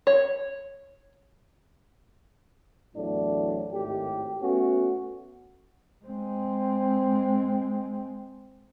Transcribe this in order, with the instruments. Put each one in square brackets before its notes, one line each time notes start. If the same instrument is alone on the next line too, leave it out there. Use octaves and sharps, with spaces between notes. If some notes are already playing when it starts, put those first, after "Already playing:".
[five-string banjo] C#5
[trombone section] E2 A2 F#3 D4
G#1 A2 G4
A3 B3 C#4 F#4
[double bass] G#3 C4